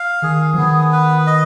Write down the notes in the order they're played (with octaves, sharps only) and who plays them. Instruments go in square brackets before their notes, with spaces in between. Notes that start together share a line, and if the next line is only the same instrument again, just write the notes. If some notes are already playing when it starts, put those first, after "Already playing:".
Already playing: [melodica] F5
[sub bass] D#3 [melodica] G#4
[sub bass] F3
[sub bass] D#3 [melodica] B3
[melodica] B4
D#5